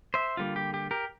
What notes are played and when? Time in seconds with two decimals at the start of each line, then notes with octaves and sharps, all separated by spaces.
0.14 C5 E5
0.37 D3 G3 A#3 F4
0.56 G4
0.74 G4
0.91 G4 A#4